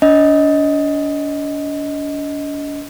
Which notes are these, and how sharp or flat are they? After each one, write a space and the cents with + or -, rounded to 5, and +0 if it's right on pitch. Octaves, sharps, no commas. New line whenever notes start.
D4 -40 D#5 +10